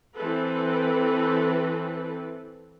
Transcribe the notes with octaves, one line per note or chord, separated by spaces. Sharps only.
E3 C4 A4 B4